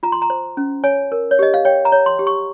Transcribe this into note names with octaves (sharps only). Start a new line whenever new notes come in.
F4 A#5
C6
A#5
C5
C#4
C#5 G#5
A#4
C#5
G4 D#5
F5
C#5 G5
A#5
C#5
C6
G4
C#6